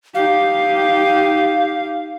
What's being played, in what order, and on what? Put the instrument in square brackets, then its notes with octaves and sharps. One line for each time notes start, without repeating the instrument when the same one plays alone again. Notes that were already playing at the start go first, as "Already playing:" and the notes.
[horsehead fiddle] D#4 G4 [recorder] F5